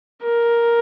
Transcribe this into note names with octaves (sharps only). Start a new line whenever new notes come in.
A#4